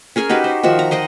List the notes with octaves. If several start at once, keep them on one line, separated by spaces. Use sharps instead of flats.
C#4 G#4 A#4 G#5
D#4 F#4 G4 B4
C5
D#3 F3 F#4 E5
A#5
C5 D#5 F#5 G5